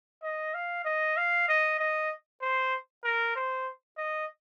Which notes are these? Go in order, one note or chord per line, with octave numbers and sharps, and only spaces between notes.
D#5
F5
D#5
F5
D#5
D#5
C5
A#4
C5
D#5